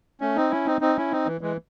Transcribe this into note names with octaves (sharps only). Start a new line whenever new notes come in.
A3 C#4
C4 D#4
C#4 E4
C4 D#4
C4 D#4
C#4 E4
C4 D#4
E3
E3 G#3